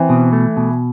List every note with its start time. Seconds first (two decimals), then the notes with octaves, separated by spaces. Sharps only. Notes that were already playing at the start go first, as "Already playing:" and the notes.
Already playing: E3 C4
0.09 B2
0.33 A3
0.57 B2